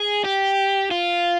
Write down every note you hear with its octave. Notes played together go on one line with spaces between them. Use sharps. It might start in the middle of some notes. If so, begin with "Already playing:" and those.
Already playing: G#4
G4
F4